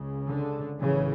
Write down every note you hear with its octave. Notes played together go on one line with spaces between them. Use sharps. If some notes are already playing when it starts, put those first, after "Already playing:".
Already playing: C#2 C#3
D3
B1 A2 C#3 E3